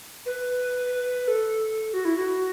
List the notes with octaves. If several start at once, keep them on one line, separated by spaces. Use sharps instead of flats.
B4
A4
F#4
E4
F#4